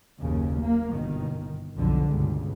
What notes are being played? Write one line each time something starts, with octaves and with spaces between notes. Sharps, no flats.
F#1 D#2 C#3
A#3
G1 B2 D#3
B1 F2 D3
C#2 G2 B2